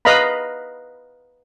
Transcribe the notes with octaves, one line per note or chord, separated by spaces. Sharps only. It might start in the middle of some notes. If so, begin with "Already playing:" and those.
B4 D#5 F5 A#5 B5